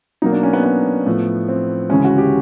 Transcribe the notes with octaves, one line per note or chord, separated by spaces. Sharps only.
B2 F#3 A#3 D#4
D4
C#4
B3
B3
A2 F3 A3
C4
D2 C#3 E3 G#3 C#4
F#4
G4